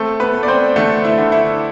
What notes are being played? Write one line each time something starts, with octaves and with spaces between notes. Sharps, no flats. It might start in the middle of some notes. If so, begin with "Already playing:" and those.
Already playing: A3 C4 A4
B3 B4
A3
D5
C4 C5
D3 A3 A4
E4
D3
E4